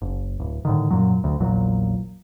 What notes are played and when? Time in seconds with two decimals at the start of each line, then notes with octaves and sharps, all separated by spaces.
0.02 F#1
0.40 D1
0.65 A2 D3 D#3
0.91 F#2 A#2 F#3
1.24 D2
1.40 A#1 E2 A#2 F#3